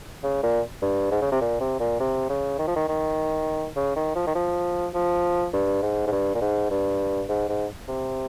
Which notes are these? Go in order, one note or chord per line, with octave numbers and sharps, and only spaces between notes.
C#3
A#2
G2
G#2
C#3
C3
A#2
C3
A#2
C3
C#3
D#3
F3
D#3
D#3
C#3
D#3
F3
D#3
F3
F3
G2
G#2
G#2
G2
A#2
G#2
G2
G#2
G#2
C3